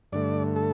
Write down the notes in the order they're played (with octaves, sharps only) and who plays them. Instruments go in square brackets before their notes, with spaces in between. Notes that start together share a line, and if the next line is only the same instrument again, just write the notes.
[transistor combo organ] G2 D3 A3 D5
A4